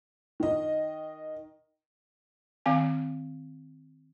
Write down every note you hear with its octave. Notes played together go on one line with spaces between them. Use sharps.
D#3 D#5
D#3 C4 F5 G#5